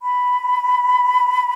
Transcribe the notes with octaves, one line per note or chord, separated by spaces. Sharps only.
B5